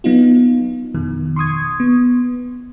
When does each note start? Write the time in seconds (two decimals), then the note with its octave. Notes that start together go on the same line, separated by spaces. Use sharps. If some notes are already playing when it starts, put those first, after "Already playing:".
0.04 F#3 B3 D#4 F4
0.94 F2 B2 D#3
1.36 C6 C#6 D#6 G#6
1.80 B3